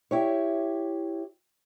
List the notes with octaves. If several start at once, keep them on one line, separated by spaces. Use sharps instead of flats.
E4 G4 C#5